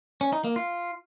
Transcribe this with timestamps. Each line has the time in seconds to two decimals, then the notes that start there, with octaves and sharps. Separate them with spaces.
0.21 C#4
0.33 D#4
0.44 A#3
0.56 F4